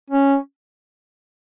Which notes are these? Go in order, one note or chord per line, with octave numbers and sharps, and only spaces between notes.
C#4